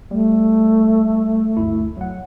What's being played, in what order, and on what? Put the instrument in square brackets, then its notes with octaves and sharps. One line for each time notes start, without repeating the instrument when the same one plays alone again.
[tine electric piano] G3 [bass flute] A3
[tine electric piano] G1 D2 E4
F#3 F#5